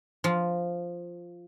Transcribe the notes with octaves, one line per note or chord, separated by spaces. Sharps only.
F3